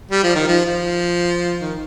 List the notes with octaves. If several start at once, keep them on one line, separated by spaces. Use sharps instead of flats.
G3
F3
D#3
F3
F3
D#3